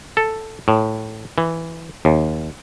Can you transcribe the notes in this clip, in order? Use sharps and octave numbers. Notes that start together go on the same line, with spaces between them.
A4
A2
E3
D#2